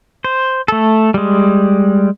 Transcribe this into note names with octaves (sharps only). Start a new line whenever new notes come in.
C5
A3 A4
G3 G#3